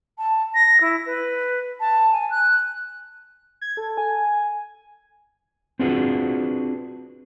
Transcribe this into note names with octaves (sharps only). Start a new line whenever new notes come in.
A5
A#6
E4
B4
A5
G#5
F#6
G#6
A4
G#5
C4 D4 F4 F#4 G#4 B4